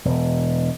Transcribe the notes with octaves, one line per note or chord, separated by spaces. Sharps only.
E1